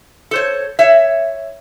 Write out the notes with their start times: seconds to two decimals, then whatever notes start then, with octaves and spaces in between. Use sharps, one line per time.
0.31 A4 C5 C#5
0.79 C#5 E5